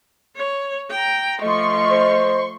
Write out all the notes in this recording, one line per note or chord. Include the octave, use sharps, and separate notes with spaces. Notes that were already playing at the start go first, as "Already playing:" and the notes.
C#5
G5 A#5
F3 A3 D#5 C6 C#6
C5